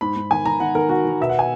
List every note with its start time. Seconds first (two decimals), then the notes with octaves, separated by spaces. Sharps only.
0.01 G#2 B5
0.16 G#2
0.31 D#3 G#5
0.45 D#3 A#5
0.60 D#3 F#5
0.75 D#3 A#4
0.89 D#3 F#4
1.05 D#3
1.20 B2 E5
1.29 F#5
1.39 G#5